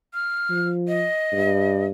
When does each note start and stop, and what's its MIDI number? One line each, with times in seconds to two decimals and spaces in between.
0.14 0.68 89
0.50 1.06 53
0.88 1.85 75
1.33 1.92 43